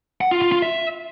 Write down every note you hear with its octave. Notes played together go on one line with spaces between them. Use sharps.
F#5
F4
F4
F4
E5